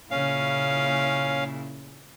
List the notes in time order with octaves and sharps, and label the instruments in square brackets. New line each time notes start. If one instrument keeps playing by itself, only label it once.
[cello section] A#2 C#3 E4 [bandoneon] C#4 F5